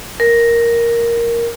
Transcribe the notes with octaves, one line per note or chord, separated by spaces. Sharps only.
A#4